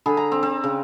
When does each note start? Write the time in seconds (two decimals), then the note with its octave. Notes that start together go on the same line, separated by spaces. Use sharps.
0.06 D3 G#4 B5
0.17 A#5
0.32 C4
0.43 C4
0.64 C#3